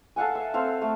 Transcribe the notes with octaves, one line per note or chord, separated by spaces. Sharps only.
A4 F5 F#5 G#5
E5
C4 A4 F5
A3